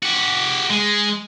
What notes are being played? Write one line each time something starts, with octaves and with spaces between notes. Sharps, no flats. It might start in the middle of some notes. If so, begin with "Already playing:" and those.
F#4 G4
G#3